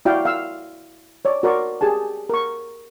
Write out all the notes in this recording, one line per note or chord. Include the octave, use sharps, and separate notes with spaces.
E4 F#4 D5 F5 G5
F5 E6
C#5 D5
F#4 A#4 D5 C6 C#6
G4 G#4 G#5 A5
A#4 C#6